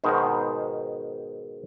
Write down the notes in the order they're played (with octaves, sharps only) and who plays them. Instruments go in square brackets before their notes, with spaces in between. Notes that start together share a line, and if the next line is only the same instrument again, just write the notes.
[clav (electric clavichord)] G#2 B2 D#3 C5